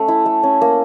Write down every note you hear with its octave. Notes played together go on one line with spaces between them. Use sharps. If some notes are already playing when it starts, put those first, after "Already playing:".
Already playing: A3 C#4
E4
A3
C#4
A#3